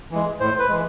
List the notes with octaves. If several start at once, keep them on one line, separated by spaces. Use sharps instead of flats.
E3 G#3
A2 C5
B4
E3 G#3